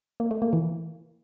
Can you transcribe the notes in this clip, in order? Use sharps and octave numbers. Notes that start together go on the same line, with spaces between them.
A#3
A3
A#3
E3